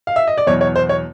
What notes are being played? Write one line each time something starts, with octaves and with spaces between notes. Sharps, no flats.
F5
E5
D#5
D5
E2 B2 F#3 C#5
C#5
C5
C#5